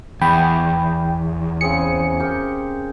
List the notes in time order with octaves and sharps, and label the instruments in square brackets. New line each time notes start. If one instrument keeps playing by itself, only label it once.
[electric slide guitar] E2 [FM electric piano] G5 B5
[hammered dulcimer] C#3 C4 G#4 [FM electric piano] C#7
[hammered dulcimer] G4 A#4 G5